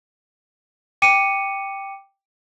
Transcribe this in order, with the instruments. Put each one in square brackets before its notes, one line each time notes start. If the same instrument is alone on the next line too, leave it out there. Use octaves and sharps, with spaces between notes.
[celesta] G5 D6 C#7 D#7